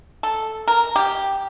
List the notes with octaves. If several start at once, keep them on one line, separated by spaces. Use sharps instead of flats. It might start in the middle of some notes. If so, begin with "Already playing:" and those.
A4
A#4
G4